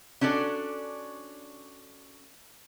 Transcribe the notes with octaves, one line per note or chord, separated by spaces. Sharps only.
C#4 D4 F#4 A4 D5